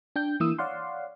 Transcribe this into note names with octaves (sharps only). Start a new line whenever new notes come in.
D4 G5 G6
E3 A#3 E4 D#6 E6
C#5 D5 F5 F#5 C6